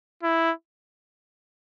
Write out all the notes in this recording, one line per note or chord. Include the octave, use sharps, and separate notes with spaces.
E4